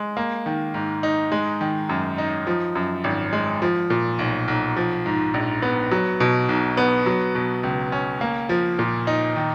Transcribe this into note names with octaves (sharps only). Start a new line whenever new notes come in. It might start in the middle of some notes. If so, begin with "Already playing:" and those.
Already playing: G#3
A#3
D#3
G#2
D#4
G#3
D#3
F#2
D#4
F3
F#2
G#1
G#3
F3
A#2
B1
B1
F3
G#2
A#1
B3
F#3
B2
B1
B3
F#3
B2
C#2
C#4
A#3
F3
A#2
D#4
D#3